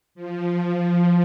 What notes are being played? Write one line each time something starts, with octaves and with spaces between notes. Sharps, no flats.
F3